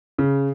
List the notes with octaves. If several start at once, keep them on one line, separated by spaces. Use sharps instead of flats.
C#3